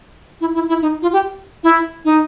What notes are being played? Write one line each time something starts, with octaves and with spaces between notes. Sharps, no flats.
E4
E4
E4
D#4
F4
G4
E4
D#4